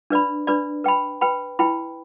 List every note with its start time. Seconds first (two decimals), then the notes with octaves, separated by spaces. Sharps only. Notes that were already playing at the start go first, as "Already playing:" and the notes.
0.10 D4 B4 D5 B5
0.47 D4 B4 D5 B5
0.84 B4 G5 B5
1.21 B4 G5 B5
1.59 E4 B4 G5 B5